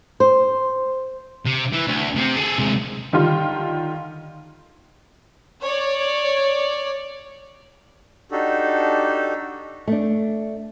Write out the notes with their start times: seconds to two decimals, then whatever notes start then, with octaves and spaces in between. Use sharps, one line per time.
0.20 C5
1.46 C3
1.73 E3
1.87 D2
2.16 C3 C4
2.35 G#4 A4
2.58 C3 G#3
3.13 D3 D#3 G3 F4
5.62 C#5 D5
8.32 D4 D#4 F#4 G4 A4
9.87 A3 D4